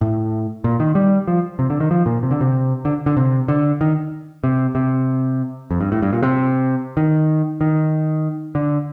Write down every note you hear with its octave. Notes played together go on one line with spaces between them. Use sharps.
A2
A#2
D#3
G3
F3
C3
D3
D#3
F3
A#2
C3
D3
C3
D3
D3
C3
D3
D#3
C3
C3
F2
G2
A2
G2
A#2
C3
D#3
D#3
D3